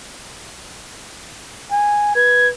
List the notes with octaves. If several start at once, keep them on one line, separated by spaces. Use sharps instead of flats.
G#5
B4 G#6